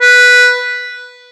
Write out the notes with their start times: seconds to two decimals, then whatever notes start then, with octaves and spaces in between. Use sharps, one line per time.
0.02 B4